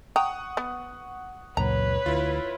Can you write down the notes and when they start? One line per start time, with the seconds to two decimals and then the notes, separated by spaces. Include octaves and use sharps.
0.16 F#5 G5 A#5 C#6 D#6
0.57 B3
1.57 C#2 F#2 A#2 B4 C#5 A#5
2.06 D2 E4 F4